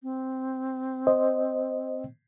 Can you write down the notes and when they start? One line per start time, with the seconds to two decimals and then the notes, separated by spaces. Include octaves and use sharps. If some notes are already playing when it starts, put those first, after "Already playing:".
0.03 C4
1.07 C5 D#5